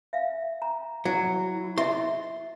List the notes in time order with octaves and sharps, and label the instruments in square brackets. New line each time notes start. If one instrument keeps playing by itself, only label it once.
[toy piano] E5 F5
A#5
[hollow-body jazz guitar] F#3 [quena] E4
[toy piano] D#5 E5 [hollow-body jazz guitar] C6